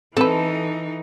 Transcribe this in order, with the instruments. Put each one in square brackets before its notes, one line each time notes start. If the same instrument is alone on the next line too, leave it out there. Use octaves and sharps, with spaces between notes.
[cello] E3 D#4 [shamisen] C4 B4 [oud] A4